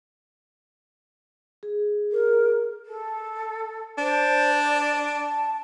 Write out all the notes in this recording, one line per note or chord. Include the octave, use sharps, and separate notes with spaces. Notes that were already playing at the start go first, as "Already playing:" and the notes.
G#4
A#4
A4
D4 C5
D5
A5